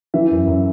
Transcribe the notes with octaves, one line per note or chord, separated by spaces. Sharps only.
E3 E5
F#2
F#2